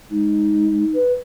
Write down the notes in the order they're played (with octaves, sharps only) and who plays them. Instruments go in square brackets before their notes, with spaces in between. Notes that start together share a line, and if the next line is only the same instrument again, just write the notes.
[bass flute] G#3 [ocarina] D#4
[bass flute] B4